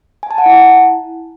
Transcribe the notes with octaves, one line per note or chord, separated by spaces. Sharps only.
G#5
A5
F#5
E4